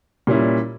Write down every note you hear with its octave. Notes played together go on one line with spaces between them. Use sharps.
A#2 G3 C#4 E4